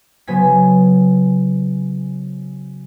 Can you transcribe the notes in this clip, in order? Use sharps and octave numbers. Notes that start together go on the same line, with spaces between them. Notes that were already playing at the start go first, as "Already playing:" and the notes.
C#3 F#3 B3 C5 G#5 B6